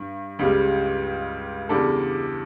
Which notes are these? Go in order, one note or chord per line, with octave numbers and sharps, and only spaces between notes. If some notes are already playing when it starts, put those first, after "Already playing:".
Already playing: G2
C#2 C#3 G3
E2 C#3 G3 D4 A4